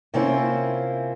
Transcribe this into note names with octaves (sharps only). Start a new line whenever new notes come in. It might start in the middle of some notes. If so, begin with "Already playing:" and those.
C3 A#3 C4 C#4 E4 F4